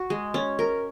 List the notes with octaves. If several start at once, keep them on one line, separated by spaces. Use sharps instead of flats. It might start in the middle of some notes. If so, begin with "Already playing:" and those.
Already playing: F#4
G#3
C#4
A#4